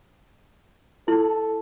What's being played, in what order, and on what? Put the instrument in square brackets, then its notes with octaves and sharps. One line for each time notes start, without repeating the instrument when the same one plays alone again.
[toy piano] E4 [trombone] A4